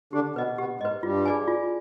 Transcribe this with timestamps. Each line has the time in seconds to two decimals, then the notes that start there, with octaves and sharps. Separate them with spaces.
0.13 D3 D4 G4
0.36 B2 B3 B4 D#5
0.58 B2 B3 G4
0.80 G#2 G#3 D#5
0.85 B4
1.03 G2 G3 F4
1.26 G#4 D5 G#5
1.48 F4